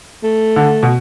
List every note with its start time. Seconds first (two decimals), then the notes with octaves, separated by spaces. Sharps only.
0.24 A3
0.56 D3
0.83 B2